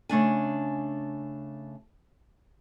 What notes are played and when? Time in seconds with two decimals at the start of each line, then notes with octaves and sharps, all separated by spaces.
0.09 C#3 A3 D4 G#5